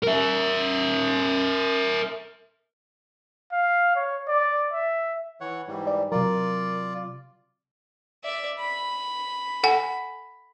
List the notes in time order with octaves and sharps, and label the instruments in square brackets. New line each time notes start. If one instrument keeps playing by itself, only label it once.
[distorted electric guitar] A#4 E5
[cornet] F5
C#5
D5
E5
[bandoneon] E3 C#5 F#5
G#2 E3 G3
[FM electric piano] D5
[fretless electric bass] C3 F#3 [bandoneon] F4 D5 [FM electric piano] A#4
[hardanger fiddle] D5 E5
B5
[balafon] A4 F#5 G#5